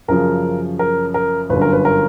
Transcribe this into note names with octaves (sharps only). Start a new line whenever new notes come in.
F#2 C#3 F3 A#4
A#4
A#4
G1 F#2 D3 B4
A#4
B4
A#4